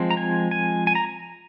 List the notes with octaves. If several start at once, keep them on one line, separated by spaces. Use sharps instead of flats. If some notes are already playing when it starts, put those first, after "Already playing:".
Already playing: F3 G#3 C4
A#5
G#5
G#5
G#5
A#5